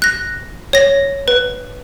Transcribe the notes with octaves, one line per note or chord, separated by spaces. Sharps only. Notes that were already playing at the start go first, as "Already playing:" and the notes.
F#6 A#6
C#5 A#6
B4